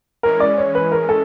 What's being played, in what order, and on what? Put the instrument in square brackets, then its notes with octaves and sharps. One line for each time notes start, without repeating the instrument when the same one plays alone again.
[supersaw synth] E3 G#3 C#4 [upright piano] A#4
[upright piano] D5
C#5
B4
A#4
A4